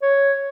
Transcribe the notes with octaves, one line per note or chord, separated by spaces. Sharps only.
C#5